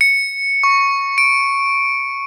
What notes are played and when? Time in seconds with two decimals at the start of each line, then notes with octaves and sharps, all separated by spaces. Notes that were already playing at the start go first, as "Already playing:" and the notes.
0.01 C#7
0.63 C#6
1.18 D7